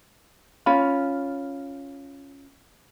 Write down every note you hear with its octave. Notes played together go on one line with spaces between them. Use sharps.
C#4 F4 B5